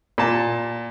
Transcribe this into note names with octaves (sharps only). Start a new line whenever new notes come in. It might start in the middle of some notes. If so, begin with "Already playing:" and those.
A#2 A5